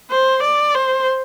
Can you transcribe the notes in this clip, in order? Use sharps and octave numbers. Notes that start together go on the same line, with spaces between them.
C5
D5
C5